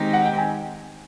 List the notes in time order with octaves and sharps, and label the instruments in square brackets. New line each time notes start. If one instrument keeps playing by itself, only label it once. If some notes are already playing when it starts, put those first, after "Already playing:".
Already playing: [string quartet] D#3 G#3 C4 D#4 G4
[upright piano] F#5
G5
G#5